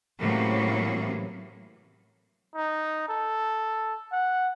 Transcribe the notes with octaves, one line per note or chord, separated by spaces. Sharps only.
A2 C3 E3 F#3 A#3 C#4
D#4
A4
F#5